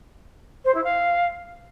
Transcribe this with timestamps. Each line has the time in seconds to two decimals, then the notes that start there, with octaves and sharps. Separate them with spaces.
0.65 C5
0.74 E4
0.84 F5